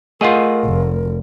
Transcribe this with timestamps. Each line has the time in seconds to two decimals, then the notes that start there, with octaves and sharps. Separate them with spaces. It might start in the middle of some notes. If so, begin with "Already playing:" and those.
0.21 A3 F4 G#4 A#4 D#5 F#5
0.66 F1